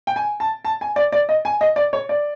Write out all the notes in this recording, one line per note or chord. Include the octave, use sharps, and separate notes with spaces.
G5
G#5
A5
A5
G#5
D5
D5
D#5
G#5
D#5
D5
C#5
D5